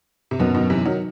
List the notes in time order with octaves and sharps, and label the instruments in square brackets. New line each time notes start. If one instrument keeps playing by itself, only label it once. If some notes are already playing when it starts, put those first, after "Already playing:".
[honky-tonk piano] C3
[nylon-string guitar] F#2 F#3 B3 D#4 [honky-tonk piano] B2 D#3
[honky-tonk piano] B2 D#3
C3 E3
D#3 F#3